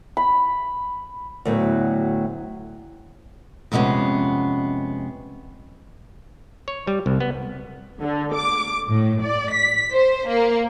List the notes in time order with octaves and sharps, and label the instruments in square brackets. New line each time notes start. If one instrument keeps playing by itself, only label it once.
[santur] B5
[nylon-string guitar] D2 A2 F#3 B3
[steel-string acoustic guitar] F2 C3 G#3 B3 C#4
[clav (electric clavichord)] C#5
G3
C2
B3
[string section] D3
D6
A2
D5
B6
C5
A#3